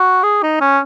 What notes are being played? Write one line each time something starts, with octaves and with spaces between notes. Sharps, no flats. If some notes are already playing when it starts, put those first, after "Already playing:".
Already playing: F#4
G#4
D#4
C#4